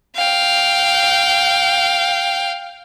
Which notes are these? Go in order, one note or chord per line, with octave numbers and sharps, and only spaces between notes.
F5 G5